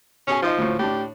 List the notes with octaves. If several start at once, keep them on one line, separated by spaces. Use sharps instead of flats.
B2 C#4 G#4 G#5
F3 D#4 C5 D#5
D2 A2
A2 D4 G4